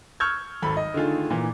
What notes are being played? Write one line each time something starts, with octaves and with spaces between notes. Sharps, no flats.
C#6 E6 F6 G6 G#6
G#1 A4 B5
D#5
D3 D#3 A3 F4 G#4
A#2 E3